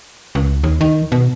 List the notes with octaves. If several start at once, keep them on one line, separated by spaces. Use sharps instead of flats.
C#2
D#2
D#3
B2